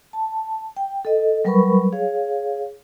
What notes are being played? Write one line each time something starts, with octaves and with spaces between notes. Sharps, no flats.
A5
G5
A4 D#5
F#3 G3 A#4 B4 B5 C#6
G#4 C#5 F5